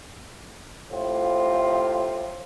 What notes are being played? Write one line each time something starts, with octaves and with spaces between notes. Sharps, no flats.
A2 C3 F4